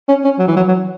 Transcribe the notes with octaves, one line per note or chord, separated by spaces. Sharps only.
C#4
C#4
F#3
E3
F#3
F#3